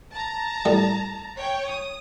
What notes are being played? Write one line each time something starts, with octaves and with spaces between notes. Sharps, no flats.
A5 A#5
A2 G3
C#5 G5
D#6